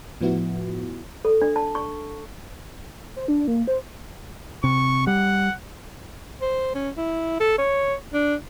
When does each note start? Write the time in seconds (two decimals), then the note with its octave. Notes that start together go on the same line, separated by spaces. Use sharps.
0.21 A2 F3 B3 E4 F#4
1.25 A4
1.42 D4
1.56 A5
1.75 C#6
3.16 C5
3.28 D4
3.48 A#3
3.67 C5
4.64 C3 C#6
5.07 G3 F#5
6.41 C5
6.75 C#4
6.97 E4
7.40 A4
7.58 C#5
8.14 D4